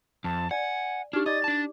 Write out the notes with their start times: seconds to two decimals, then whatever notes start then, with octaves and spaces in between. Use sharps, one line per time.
0.24 F2 A5
0.51 D5 F#5 G#5
1.13 D4 D#4 G4 F6
1.26 D5 D#5 D6 A6
1.44 D4 A5